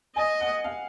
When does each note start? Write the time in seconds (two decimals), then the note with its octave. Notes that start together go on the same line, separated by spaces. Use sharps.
0.16 D#5 G#5
0.40 F#5
0.64 F5